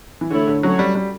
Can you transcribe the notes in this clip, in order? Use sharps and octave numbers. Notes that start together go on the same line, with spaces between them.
E3
D3 A3 E4 A4 C#5
D3
F#3 C#4 F#4 A4 C#5
G3
G3